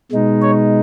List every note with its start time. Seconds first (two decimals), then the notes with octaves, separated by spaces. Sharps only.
0.12 B2 G#3 D#4
0.42 C#5